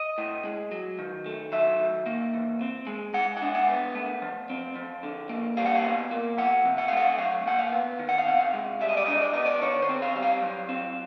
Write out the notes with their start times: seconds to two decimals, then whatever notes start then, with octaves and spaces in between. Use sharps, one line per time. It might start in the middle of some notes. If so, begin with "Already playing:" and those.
Already playing: D#5
0.18 A2
0.45 G#3
0.72 F#3
0.99 D#3
1.26 A3
1.52 F#3 E5
1.79 D#3
2.06 A#3
2.34 E3
2.61 C4
2.87 G#3
3.14 G#3 F#5
3.37 F#5
3.42 D4
3.55 F#5
3.68 B3
3.95 A3
4.22 F3
4.49 C4
4.76 F3
5.03 D3
5.29 A#3
5.57 G3 F5
5.66 F#5
5.75 F5
5.84 B2
6.11 A#3
6.38 F3 F#5
6.65 C3
6.78 F#5
6.88 F5
6.92 A3 F#5
7.18 F#3 F5
7.46 A#2 F#5
7.59 F5
7.72 B3
7.99 D#3
8.09 F#5
8.18 F5
8.27 C3 F#5
8.40 F5
8.53 G#3
8.81 G3 E5
8.89 D#5
8.97 D5
9.06 D4 D#5
9.22 D5
9.34 B3 D#5
9.46 D5
9.62 D#3 C#5
9.82 C5
9.89 C4
10.02 F5
10.15 G3
10.23 F5
10.42 F#3
10.69 C4